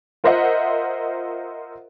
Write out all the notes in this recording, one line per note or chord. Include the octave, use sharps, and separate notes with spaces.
F4 A#4 C5 D#5 E5 F#5